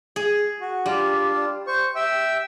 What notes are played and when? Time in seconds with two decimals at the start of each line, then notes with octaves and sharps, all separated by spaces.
0.16 G#4
0.61 F#4
0.86 G3 D4 F4
1.67 C5 C#6
1.96 E5 G5 E6